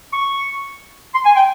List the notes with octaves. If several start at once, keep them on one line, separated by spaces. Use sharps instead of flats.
C#6
C6
G#5
G5